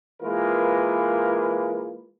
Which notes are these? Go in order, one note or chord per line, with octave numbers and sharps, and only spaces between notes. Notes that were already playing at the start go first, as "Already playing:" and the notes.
E3 G#3 A#3 F4 A#4 B4